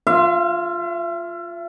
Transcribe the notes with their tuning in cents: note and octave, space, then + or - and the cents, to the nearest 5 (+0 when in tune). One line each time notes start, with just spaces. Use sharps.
F4 +0 E5 +40